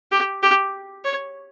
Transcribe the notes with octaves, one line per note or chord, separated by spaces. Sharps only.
G4
G4
C#5